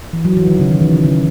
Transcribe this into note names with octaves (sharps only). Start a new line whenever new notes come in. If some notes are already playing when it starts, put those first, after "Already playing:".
E3
F#3
E3
D#3
C#3
D#3
E3
E3
C#3